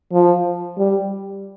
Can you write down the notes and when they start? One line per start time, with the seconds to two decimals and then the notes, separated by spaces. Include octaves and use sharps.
0.12 F3
0.78 G3